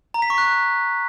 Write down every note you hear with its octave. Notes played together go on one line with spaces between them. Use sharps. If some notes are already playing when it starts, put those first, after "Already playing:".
A#5
B6
C#6
F#6